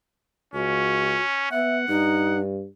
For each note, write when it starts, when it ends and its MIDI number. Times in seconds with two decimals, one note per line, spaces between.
0.54 1.16 37
0.54 1.50 61
0.54 1.22 66
1.52 1.87 59
1.52 1.77 76
1.52 2.41 78
1.88 2.65 43
1.88 2.40 63